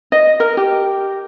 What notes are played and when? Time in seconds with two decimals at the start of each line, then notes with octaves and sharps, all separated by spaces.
0.12 D#5
0.40 A#4
0.57 G4